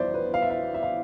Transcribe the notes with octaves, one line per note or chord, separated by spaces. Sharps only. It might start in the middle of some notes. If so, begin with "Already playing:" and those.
Already playing: G1 F2 E3 B3 C5 D5 E5
B4
F5
E5
F5
E5
F5